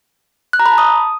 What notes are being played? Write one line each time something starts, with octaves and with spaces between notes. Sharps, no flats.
F#6
A#5
B5
A5
D#6